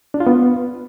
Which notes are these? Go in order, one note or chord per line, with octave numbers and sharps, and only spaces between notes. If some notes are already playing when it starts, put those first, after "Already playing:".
D4
F4
B3